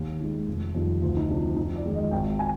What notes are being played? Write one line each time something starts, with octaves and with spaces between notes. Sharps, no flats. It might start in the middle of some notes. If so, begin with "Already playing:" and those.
Already playing: D#2 G4
D#3 G#3
F1
F2 D#3 G3
D2 F4
D#4
C3 F3 D4
C4
F2 D#4
D5
D#3 G#3
D#5
G#1 G5
G#5